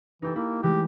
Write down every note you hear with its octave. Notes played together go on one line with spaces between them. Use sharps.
E3 D#4 G4 A4
A#3 E4
E3 G#3 A3 G4